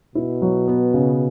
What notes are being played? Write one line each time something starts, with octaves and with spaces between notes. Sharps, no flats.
B2 E4
F#3
B3
C#3